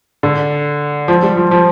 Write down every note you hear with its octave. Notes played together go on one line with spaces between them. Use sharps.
D3
F3
G3
F3
F3